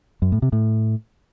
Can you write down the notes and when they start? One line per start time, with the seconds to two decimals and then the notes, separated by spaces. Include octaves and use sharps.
0.22 F#2
0.32 A2
0.42 C3
0.52 A2